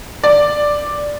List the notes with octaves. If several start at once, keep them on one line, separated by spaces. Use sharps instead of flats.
D5